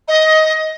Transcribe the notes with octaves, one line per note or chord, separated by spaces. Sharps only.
D#5